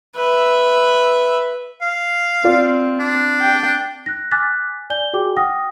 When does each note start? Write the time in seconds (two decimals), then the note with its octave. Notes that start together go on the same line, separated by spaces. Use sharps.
0.16 B4 E5
1.81 F5
2.44 C4 F4 D5
2.99 D4
3.41 G5
4.06 F#6 A#6
4.31 G#5 D6 F6 F#6 A6 B6
4.90 D5 G#5 G6 G7
5.13 F#4 G#4 G5 D6
5.36 F#5 G5 D#6 F6 A#6